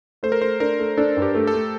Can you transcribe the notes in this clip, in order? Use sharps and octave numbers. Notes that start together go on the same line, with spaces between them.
A3 C5
A#4
A3 C5
D4 A#4
A3
D4 A4
G2
G4
A3
A4
A3